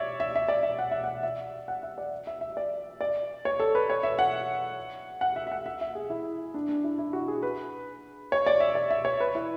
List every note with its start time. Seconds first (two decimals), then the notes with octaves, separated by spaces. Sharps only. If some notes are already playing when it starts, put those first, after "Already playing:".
Already playing: C#5 D5 E5
0.20 E5
0.36 E5
0.48 D5
0.63 E5
0.79 F#5
0.92 E5
1.04 F#5
1.23 E5
1.68 F#5
1.83 E5
1.98 D5
2.27 E5
2.41 E5
2.57 D5
3.01 D5
3.45 C#5
3.60 A4
3.75 B4
3.90 C#5
4.03 E5
4.19 F#5
5.21 F#5
5.36 E5
5.47 E5
5.52 F#5
5.66 E5
5.81 E5
5.95 G#4
6.10 E4
6.54 D4
6.69 D4
6.84 E4
6.98 E4
7.13 F#4
7.28 G#4
7.43 B4
8.32 C#5
8.46 D5
8.60 E5
8.75 D5
8.91 E5
9.05 C#5
9.20 B4
9.35 E4